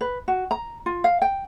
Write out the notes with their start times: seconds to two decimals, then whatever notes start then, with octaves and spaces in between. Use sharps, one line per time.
0.01 B4
0.28 F#4
0.51 A#5
0.86 F4
1.04 F5
1.22 G5